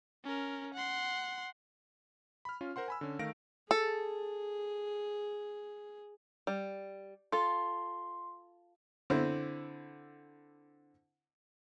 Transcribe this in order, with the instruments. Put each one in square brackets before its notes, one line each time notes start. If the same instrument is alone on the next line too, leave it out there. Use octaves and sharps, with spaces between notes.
[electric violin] C#4 A#4
F#5 C6
[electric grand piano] B5 F6
C#4 F4
A#4 C5 F#5 C6
G#5 B5 E6
D3 C#4
D#3 A3 F5 A#6 D7
[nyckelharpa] G#4 [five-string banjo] A4
[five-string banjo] G3
[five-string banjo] F4 A4 [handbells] C6
[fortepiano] D3 C4 E4